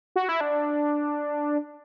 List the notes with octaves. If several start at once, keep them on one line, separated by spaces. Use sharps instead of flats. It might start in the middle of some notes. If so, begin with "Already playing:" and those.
F#4
E4
D4